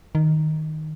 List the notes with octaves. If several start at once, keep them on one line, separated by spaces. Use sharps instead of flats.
D#3